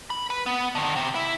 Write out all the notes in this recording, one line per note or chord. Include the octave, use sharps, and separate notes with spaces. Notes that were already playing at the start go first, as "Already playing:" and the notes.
B5
B4
B3
D3 D#3
C3
E4